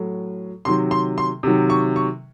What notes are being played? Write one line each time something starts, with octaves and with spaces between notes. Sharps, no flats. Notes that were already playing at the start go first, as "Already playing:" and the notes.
Already playing: A2 F#3
C3 D#3 F#3 C6
C6
C6
C3 D#3 F#3
C#6
C#6